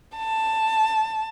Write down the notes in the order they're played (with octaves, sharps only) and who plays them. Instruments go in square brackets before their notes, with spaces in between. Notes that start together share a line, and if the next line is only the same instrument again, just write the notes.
[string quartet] A5